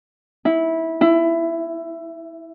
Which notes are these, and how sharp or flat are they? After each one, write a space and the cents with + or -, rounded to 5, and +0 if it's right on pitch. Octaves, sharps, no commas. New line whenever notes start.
E4 -15
E4 +15